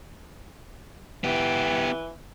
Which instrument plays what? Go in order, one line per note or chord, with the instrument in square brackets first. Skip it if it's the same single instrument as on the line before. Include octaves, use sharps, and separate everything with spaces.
[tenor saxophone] E3 [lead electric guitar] B3 G4